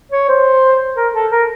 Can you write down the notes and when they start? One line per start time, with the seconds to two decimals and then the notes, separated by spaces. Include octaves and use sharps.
0.12 C#5
0.29 C5
0.96 A#4
1.14 A4
1.32 A#4